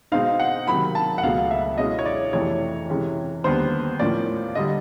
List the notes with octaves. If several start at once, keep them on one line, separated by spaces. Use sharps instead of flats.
B2 G#3 C4 D#4 F5
F#5
C3 D#3 F#3 A#3 B5
A5
F#5
C#2 B2 F#3 A3 F5
E5
B2 G#3 C#4 E4 D#5
C#5
D5
F2 C3 E3 A3 C#5
C3 E3 G#3 C#4
D#2 D3 G3 B3 D4 C5
A2 F3 A#3 C#4 D5
D3 G3 D#5